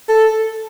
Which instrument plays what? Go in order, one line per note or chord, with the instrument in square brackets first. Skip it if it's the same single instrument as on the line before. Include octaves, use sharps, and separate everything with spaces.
[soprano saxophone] A4